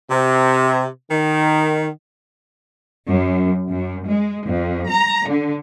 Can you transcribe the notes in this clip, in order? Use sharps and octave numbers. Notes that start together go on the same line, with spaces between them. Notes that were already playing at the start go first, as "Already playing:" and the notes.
C3
D#3
F#2
F#2
G#3
F2
A#5
D3